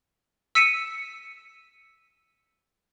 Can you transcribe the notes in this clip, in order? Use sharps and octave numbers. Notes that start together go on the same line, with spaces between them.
E6 B6 C#7 D#7 E7